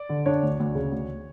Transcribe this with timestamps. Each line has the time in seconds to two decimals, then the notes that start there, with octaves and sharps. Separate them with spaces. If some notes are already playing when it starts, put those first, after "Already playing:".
Already playing: D5
0.09 D3
0.26 D4 C#5
0.42 D2
0.60 D2
0.75 C#3
0.91 D2